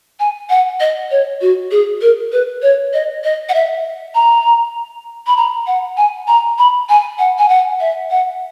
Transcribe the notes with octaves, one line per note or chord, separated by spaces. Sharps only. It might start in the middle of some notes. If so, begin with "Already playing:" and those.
G#5
F#5
D#5
C#5
F#4
G#4
A#4
B4
C#5
D#5
D#5
F#5
E5
A#5
B5
A#5
F#5
G#5
A#5
B5
G#5
F#5
G#5
F#5
E5
F#5